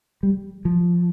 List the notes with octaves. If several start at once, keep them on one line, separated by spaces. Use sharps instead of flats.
G3
F3